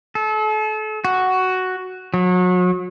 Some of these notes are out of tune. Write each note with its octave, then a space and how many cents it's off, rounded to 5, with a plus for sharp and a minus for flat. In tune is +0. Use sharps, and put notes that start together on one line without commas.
A4 -35
F#4 +5
F#3 -35